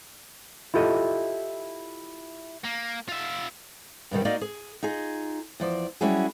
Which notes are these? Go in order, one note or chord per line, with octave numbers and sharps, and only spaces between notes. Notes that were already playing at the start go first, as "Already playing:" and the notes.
E4 F4 G4 A4 D#5
A#3
F4 E5
G2 B2 D#3 G3
A#3 D#4 F#4 D5 D#5 F5
G#4
D#4 F4 G#4
E2 F3 D5
F#3 G3 C#4 E4 F#4 G#4